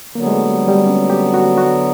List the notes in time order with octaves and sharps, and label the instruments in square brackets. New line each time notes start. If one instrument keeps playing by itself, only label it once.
[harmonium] D3 F#3 B3 [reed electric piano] A#3
[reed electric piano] G#3
A3
G3
G3
C#4
G4
F#4
F#4